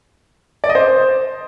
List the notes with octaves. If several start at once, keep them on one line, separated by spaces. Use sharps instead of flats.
D5
D#5
C5